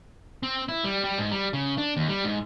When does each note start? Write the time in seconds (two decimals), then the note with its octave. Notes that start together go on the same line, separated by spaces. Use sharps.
0.43 C4
0.68 E4
0.84 G3
1.04 G3
1.18 G#2
1.31 G3
1.53 C#3
1.78 D4
1.97 D#2
2.08 G3
2.24 G#2